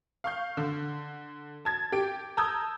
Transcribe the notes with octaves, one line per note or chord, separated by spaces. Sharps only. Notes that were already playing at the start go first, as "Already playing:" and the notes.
F5 C#6 G6
D3
A5 G#6 A6
G4 G5 D7
A5 A#5 D#6 E6 G6 G#6